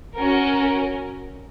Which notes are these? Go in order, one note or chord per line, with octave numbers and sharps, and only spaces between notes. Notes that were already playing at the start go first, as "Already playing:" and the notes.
C#4 F#4 A#4